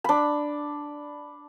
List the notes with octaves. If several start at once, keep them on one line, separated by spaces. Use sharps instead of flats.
D4 B5